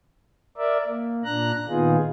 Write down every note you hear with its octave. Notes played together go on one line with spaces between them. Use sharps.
A#4 D5 E5
A#3
A#2 D4 A#5 F#6
A#2 D#3 B3 D#4 F4 G#4